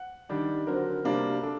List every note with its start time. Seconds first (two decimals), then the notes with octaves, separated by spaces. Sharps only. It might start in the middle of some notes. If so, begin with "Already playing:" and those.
Already playing: F#5
0.29 D#3 G3 D4
0.67 D3 F#3 C4 A#4
1.04 C3 G3 A#3 D4
1.43 D4 A4